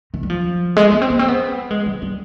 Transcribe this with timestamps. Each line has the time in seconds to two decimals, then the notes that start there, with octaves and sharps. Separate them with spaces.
0.14 D#3
0.23 G3
0.30 F3
0.77 G#3
0.92 B3
1.02 C4
1.10 B3
1.19 C4
1.28 B3
1.71 G#3
1.86 G3
2.02 G3